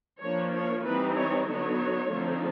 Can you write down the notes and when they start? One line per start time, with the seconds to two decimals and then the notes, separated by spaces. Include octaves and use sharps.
0.21 F3 A#3 D4 C#5
0.54 C#5
0.84 E3 G3 C4 D#4 B4
1.16 C#5
1.47 D3 F#3 B3 D#4 C#5
2.10 D3 F3 A3 C4 D#4